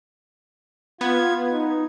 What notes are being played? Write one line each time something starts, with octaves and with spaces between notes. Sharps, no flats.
B3 F4 G#6
D#4